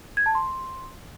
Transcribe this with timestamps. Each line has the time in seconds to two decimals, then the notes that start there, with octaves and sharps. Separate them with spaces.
0.17 G#6
0.26 A5
0.35 C6